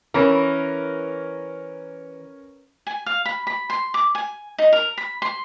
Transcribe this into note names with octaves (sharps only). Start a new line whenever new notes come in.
E3 C#4 A#4
G#5
F5
B5
B5
C6
D6
G#5
D#4
A#4
B5
C6